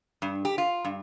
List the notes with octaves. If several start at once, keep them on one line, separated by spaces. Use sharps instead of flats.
G2
G4
F4
G2